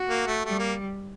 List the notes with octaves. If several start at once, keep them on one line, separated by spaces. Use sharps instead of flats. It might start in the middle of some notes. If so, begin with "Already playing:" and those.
Already playing: F#4
A#3
A3
G3 A3
A#3